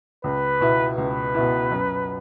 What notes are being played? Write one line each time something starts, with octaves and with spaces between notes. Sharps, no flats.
C#2 B4
B2 B3 E4
C#2 B4
B2 B3 E4
F#2